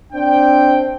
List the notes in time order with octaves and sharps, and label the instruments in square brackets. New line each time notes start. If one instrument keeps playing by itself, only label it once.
[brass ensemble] C4 D4 G5